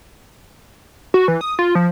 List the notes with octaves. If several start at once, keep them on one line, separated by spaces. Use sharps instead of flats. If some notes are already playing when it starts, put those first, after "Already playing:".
F#4
E3
D#6
F4
F3